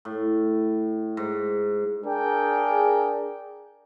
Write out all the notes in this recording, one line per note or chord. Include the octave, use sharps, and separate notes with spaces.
A2
G#2
D4 G#4 A#4 G5